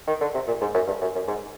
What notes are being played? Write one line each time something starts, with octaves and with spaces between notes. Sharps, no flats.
D#3
D3
C3
A#2
G#2
F#2
G2
F#2
F#2
G#2